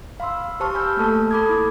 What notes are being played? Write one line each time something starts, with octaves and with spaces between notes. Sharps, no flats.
F5 B5 C6 E6
G4 C5 A5 C#6 F6
G#5 B5 E6 G6
A3 A#3 A4 A5
A4 B5 D6 D#6 G#6
E4